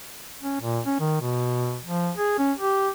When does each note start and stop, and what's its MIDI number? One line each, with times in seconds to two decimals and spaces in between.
0.42 0.59 61
0.61 0.81 46
0.86 0.96 61
1.00 1.16 51
1.21 1.79 47
1.84 2.11 53
2.16 2.35 68
2.38 2.52 61
2.58 2.89 67